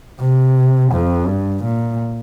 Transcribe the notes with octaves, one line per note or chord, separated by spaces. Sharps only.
C3
F2
G2
A#2